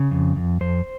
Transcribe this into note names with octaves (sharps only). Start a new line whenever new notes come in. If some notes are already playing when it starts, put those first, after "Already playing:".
Already playing: C#3
F2
F2
F2 C5